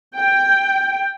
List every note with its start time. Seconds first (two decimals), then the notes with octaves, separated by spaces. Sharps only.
0.16 G5